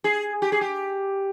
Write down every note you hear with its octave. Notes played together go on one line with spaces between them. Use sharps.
G#4
G4
G#4
G4